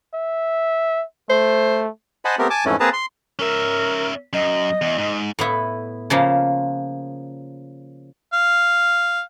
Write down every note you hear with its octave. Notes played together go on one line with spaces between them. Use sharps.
E5
A3 C5
C5 D#5 F#5 G#5 A5 B5
A3 B3 C4 G4 A#4
G#5 A5 D6
F2 G#2 E3 A3 C#4
A#3 C4 G#4 B4 A5 A#5
C6
C#4 A#4 E5
F#2 D#5
E2
G#2
A2 B3 E4
C#3 F3 A#3
F5